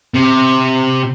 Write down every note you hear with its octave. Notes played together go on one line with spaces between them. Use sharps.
C3